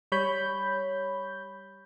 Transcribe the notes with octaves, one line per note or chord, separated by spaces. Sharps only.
G3 C#5 B5 G6